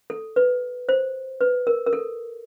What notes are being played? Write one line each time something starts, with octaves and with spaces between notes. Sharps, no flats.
A4
B4
C5
B4
A#4
A#4
A4